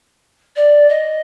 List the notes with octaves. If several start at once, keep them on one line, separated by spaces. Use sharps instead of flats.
D5
D#5